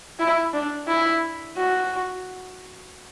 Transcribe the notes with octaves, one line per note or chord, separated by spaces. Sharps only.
E4
D4
E4
F#4